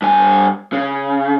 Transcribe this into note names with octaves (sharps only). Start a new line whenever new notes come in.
G2 G#5
C#3